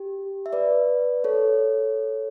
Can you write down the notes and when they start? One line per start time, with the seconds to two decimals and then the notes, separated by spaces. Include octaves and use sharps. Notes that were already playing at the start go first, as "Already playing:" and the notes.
Already playing: G4
0.46 E5
0.53 B4 D5
1.24 A4 C#5